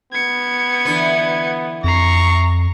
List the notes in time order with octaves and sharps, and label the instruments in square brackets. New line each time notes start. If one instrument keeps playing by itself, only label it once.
[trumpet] B3 [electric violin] G#6 C#7
[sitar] D3 E3 B4
[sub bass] F2 [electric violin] A#5 C7 [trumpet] C#6